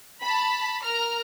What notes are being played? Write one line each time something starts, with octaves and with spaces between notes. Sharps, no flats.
A5 B5
A#4 A#5 F6